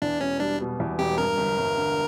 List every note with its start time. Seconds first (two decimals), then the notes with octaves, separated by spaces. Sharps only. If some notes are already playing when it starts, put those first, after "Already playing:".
0.02 E2 D4
0.21 E1 C#4
0.40 G3 D4
0.60 B2
0.80 E2
0.99 E1 G4
1.18 G2 A#4
1.38 G1
1.58 G1
1.77 D3